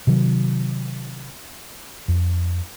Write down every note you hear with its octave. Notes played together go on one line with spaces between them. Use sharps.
C3 D#3 F#3
F2